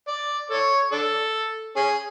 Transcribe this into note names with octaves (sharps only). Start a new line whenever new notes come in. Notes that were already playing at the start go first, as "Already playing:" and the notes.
D5
A4 C#5
D4 A4
C#4 G#4